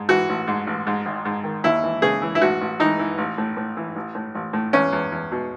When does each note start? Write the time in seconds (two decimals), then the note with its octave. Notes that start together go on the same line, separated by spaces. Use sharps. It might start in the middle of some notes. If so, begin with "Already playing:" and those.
Already playing: G#2
0.09 E3 F#4
0.29 A1
0.47 G#2
0.67 A1
0.87 G#2
1.06 G#1
1.25 G#2
1.44 D#3
1.64 D#2 E4
1.83 E3
2.02 C#3 G#4
2.22 E3
2.35 E4
2.41 A1 F#4
2.61 A1
2.80 E3 D#4
2.99 E3
3.18 A1
3.38 A2
3.57 A2
3.77 E3
3.96 A1
4.15 A2
4.35 A1
4.53 A2
4.73 E2 C#4
4.92 E2
5.12 E2
5.32 B2